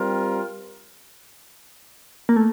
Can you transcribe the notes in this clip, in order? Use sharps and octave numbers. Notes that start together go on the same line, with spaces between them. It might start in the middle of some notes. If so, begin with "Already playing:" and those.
Already playing: G3 C4 F4 A#4
A#3
A3